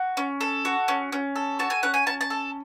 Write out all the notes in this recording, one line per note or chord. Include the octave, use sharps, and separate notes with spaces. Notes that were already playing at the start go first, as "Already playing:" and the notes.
Already playing: F#4
C#4
A4
F#4
C#4
C#4
A4
F#4 A5
G#5
C#4 F#5
G#5
C#4 A5
A5
A4